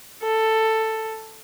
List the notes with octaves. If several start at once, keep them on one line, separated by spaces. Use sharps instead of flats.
A4